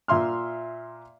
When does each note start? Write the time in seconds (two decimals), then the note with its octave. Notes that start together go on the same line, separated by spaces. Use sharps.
0.08 A#2 E5 C6 F6